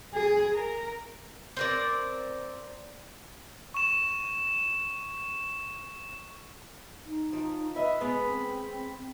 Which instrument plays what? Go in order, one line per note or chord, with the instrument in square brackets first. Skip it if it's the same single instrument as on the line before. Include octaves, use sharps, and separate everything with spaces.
[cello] G#4
A#4
[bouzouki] C4 A#4 D5
[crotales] C#6 E7
[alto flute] D#4
[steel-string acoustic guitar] F3
[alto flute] B4 [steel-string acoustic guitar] D#5 E5 [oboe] B5
[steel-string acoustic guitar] G#3 B3
[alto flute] C4